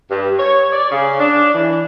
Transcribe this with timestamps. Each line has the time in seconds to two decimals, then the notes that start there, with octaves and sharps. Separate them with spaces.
0.11 G2
0.39 C#5
0.72 D5
0.91 C#3
1.19 D4
1.55 E3